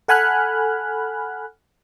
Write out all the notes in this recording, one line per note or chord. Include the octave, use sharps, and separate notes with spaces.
A4 F#5 G#5 B5 F6 F#6